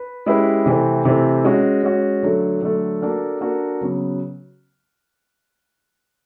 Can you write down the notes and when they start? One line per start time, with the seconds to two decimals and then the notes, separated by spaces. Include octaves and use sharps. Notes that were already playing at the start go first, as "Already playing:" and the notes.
Already playing: B4
0.26 G#3 C#4 E4 G4 B4
0.66 C3 E3 A3 C4
1.05 C3 E3 A3 C4
1.44 G#3 C#4 F#4
1.84 G#3 C#4 F#4
2.23 D3 F#3 A3
2.62 D3 F#3 A3
3.02 A#3 D4 F#4 A4
3.41 A#3 D4 F#4 A4
3.81 C#3 F#3 B3